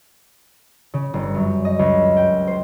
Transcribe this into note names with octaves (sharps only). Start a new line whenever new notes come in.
C#3
G1
F#2
D#5
C#2
B6
G5
C5